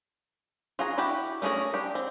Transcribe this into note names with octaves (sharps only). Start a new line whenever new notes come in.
F4 F#4 G#4 A#5
E4 F#4 G4
A3 C#4 D#4 G#4 A#4
D4 G4
C4